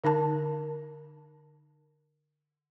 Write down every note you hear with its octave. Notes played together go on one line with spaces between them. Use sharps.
D3 D#4 A#4 A5